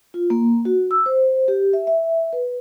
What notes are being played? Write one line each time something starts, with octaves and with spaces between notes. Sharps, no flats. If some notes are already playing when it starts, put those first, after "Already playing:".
F4
A#3
F#4
E6
C5
G4
E5
E5
B4